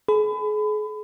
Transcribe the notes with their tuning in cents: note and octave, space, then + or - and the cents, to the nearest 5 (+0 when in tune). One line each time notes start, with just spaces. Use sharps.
G#4 +35 B5 +30